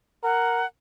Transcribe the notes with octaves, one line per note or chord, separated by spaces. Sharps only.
A#4 F#5